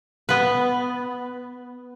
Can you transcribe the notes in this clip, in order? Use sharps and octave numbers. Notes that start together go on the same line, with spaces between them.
B3 B4